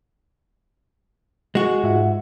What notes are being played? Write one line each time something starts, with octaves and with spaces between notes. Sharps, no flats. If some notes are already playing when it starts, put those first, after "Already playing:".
G#3 F#4
G#2 F4 E5 F#5